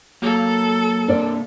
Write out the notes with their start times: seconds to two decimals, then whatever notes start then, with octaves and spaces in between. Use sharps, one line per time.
0.22 F#3 A#3 A4
1.08 C3 D4 A#4 D5